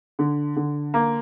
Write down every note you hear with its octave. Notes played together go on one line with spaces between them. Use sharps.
D3
D3
A#3